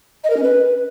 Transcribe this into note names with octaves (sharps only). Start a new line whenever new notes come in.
D#5
A#4
C#4
B4